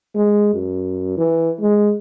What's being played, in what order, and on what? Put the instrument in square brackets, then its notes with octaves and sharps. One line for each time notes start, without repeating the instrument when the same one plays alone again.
[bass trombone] G#3
F#2
E3
G#3